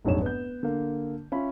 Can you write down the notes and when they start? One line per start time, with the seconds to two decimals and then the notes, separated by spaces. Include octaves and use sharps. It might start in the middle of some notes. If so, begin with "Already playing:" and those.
0.05 F1 A#1 G#2 F#3 C#5 E7
0.22 B3 G6
0.63 D3 A#3
1.32 C#4 F4 E5 B5